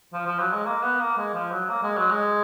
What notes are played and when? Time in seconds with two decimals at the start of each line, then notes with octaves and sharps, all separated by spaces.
0.13 F3
0.26 F3
0.40 F#3
0.53 G#3
0.65 A#3
0.83 B3
1.00 A#3
1.17 G#3
1.34 F3
1.52 F#3
1.69 A#3
1.83 G#3
1.97 F#3
2.11 G#3